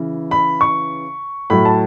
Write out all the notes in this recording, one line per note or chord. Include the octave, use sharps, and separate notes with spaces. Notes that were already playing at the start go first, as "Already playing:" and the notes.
Already playing: C#3 E3
B5
C#6
A2 F#3 B5
A5